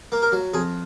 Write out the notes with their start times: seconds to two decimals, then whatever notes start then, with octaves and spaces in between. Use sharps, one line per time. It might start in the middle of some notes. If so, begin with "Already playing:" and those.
0.12 A#3
0.22 A#4
0.32 F#3
0.54 F2 G#4